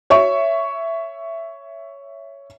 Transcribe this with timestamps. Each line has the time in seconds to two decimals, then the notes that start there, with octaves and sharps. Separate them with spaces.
0.10 C#5 E5 C#6